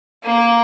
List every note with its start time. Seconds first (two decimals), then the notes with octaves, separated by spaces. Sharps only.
0.24 A#3